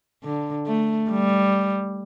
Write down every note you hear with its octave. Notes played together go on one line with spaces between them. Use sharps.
D3
A3
G3